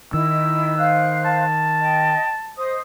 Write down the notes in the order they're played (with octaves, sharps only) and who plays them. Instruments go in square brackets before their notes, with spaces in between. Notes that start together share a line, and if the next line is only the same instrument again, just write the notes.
[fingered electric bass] D#3 [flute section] E4 D#5 [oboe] E6
[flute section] C5 F5 F#6
[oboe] A5
[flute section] D#5 G5
C5 D#5 D#6